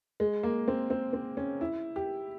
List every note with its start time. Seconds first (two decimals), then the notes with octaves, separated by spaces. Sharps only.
0.20 G#3
0.43 A#3
0.68 C4
0.90 C4
1.13 C4
1.37 C#4
1.61 E4
1.96 G4